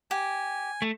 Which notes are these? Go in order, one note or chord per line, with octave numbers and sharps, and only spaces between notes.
G4 G#5
A3